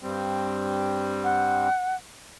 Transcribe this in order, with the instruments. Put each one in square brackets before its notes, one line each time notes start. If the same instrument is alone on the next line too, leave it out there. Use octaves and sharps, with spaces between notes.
[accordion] G2 G3 C4
[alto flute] F#5